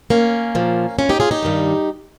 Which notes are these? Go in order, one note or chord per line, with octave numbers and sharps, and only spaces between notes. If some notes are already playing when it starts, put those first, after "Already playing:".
A#3 C#4
A#2 F3
C#4 F4
D#4 G4
F4 G#4
D#4 G4
G2 D#3 G3